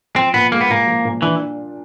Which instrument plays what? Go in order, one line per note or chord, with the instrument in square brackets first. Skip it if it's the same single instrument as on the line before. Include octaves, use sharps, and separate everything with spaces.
[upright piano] F3 [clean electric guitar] C4
[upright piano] A#2 [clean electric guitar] B3
[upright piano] G#3 [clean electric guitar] A#3
[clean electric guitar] B3
[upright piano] A#2 [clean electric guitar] A#3
[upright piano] F3
A#2
[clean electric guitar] E3 [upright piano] D4